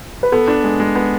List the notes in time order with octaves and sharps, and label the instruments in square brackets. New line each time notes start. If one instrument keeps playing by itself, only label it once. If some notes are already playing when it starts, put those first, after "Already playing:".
[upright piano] B4
[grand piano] B3 [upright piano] A4
[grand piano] D4
G#3
G#3
B3